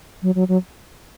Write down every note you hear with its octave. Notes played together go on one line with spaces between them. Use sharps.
F#3
F#3
F#3